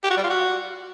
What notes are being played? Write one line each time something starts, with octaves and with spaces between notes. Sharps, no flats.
G4
F#4
G3
F4
F#4